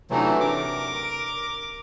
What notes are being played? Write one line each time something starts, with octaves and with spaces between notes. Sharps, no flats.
C3 E3 F#3 A3 D4 D#4
A#4 D6